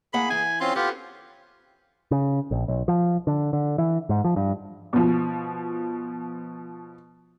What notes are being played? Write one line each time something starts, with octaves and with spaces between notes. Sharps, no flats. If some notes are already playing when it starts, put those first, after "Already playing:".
A2 A#3 G#4 F#5 B5
E3 E4 G#5
C4 C#4 F4 C6
B3 F4 G4 A4
C#3
A#1
B1
F3
D3
D3
E3
G#2
F3
G2
B2 F3